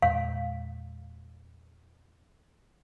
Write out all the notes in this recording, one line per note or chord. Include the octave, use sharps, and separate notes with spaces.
E2 A#2 G#3 F5